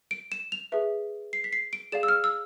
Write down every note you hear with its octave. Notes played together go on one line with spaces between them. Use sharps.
D7
E7
F7
G#4 B4 E5
C7
B6
C7
D7
G#4 D5 F5 E7
E6
F6
E6